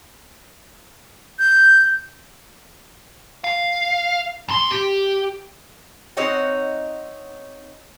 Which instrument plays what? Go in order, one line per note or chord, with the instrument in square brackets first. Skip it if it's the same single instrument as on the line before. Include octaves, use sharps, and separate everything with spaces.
[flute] G6
[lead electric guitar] F5
F2 C6
G4
[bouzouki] C4 D#4 C#5 F#5